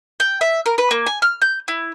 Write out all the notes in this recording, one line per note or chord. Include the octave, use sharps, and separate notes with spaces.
G5
E5
A#4
B4
A#3
G#5
F6
G6
E4